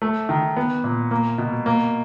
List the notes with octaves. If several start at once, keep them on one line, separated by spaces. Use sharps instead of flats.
A3
D#3
B3
A#2
A#3
B2
A#3